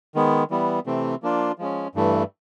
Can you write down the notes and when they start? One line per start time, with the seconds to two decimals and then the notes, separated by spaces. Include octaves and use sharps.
0.15 D#3 G#3 B3
0.50 E3 G3 B3
0.86 C3 E3 A3 C4
1.23 F3 A#3 D4 F4
1.58 F3 G#3 C#4
1.95 G2 E3 A3